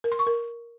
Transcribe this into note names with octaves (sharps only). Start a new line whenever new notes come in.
A#4
C6
C#6
A#4